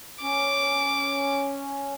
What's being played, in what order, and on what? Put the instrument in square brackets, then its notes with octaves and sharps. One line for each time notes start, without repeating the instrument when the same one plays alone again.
[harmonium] C#4 [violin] D6